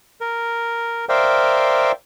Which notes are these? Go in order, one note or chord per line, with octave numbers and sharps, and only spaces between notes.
A#4
A#4 C5 D5 E5 F5 G5